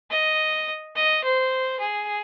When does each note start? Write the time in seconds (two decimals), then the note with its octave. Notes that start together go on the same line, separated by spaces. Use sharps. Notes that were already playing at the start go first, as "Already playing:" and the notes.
0.10 D#5
0.96 D#5
1.24 C5
1.80 G#4